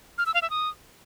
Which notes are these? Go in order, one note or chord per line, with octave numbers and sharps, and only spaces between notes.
F6
E6
F5
E5
D#6